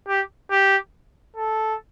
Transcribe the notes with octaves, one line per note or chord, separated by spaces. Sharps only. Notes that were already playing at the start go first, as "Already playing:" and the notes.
G4
G4
A4